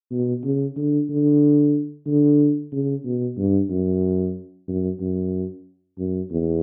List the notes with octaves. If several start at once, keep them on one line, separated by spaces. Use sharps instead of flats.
B2
C#3
D3
D3
D3
C#3
B2
G2
F#2
F#2
F#2
F#2
E2